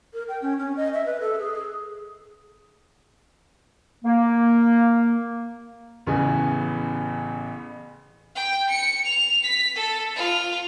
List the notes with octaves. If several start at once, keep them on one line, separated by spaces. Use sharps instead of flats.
A#4
G5
C#4
C#4
D#5
E5
B4
A4
G#4
A#3
A1 C#3 E3 B3 G#5
G5
C#7
F7
B6
A4
F4